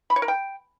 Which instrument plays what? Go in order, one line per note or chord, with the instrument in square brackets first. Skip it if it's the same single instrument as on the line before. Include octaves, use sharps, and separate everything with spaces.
[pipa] B5
C#5
A#4
G5